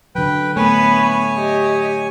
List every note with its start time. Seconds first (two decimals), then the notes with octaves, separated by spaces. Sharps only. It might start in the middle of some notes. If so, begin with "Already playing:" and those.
0.15 D3 F#3 B4 G5
0.56 A3 B3 B4 C#5 G#5
1.35 G4 D#5